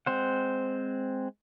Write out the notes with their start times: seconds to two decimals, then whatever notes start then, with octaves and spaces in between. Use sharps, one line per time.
0.06 G#3 C4 C5 F#5